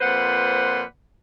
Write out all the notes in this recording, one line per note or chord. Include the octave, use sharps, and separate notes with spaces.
F2 A#2 B4 C5 F#5